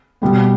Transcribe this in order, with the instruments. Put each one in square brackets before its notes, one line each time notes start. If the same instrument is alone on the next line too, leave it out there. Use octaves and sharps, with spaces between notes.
[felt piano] B2 G3 B3